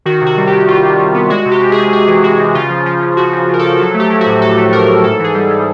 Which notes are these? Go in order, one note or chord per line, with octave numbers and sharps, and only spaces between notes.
D#3 F#4
C3
F#4
G3
G4
D#3
G3 F4
C3
G3
B3
G#3 F#4
C3
G4
C3
G#4
C3
C3 G#4
E3
G#3 F#4
C3
C#3 F4
F3
F3
C#3
C#3 F#4
F3
F3 A#4
F3 A4
F#3 A4
A3
G4
F#3
F#4
A2
A2 A4
A3
A2 A#4
A2
G#2 A4
E3 G#4
G3
G3